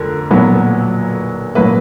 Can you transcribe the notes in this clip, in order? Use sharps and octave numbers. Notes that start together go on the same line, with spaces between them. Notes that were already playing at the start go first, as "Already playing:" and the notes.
Already playing: F2 D3 A#4
B1 A#2 F#3 B3
A#2 F#3 A#3 B4